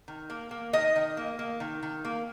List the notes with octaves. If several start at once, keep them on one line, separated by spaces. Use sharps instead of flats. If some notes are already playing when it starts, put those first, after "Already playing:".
D#3
A#3
A#3
D#3 D#5
D#3
A#3
A#3
D#3
D#3
A#3